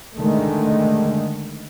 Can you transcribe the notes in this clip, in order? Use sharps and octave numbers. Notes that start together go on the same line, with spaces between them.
D3 D#3 G#3 A3